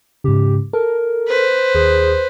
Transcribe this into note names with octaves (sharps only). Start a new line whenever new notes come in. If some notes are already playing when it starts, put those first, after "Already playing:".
G#2 C#3 G4
A4 A#4
B4 C5
D#2 G#4